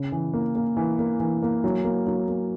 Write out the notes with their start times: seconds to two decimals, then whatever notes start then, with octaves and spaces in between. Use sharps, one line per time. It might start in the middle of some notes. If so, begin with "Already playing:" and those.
Already playing: C#3
0.12 E3
0.33 A#3
0.55 A#3
0.77 E3
0.99 A#3
1.20 E3
1.42 A#3
1.64 F#3
1.84 A#3
2.07 F#3
2.28 A#3